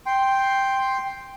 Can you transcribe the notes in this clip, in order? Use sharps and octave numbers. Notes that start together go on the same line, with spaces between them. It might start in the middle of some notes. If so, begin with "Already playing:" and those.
G5 C6